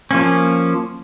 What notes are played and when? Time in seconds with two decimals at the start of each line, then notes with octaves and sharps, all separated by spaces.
0.11 F3 A#3 C#4